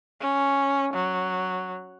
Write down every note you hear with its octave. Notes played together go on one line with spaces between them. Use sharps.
C#4
F#3